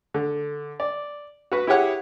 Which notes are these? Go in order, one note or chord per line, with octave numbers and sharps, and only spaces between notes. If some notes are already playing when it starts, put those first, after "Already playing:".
D3
D5
F#4 B4
E4 G4 G#4 C#5 F#5